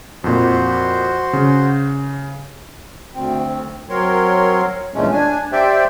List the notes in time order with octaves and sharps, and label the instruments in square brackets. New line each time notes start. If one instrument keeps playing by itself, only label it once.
[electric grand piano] F2 A#2 [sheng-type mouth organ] F#4 C5
[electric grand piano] C#3
[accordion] D2 C4
F#3 C4 A#4 C#5 C6
E2 G2 A#2 G#3 A3 C#4
D4 G#5
G4 C5 D5 E5 G5